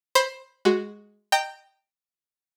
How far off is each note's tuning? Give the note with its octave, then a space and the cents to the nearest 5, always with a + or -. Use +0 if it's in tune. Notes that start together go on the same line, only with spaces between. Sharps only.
C5 +15 B5 +0
G#3 +0 F#4 +0
D#5 -20 G5 +0 A#5 -30